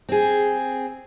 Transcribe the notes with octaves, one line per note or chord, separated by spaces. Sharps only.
C4 G#4